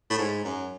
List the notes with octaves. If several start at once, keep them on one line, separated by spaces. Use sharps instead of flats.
A2
G#2
F#2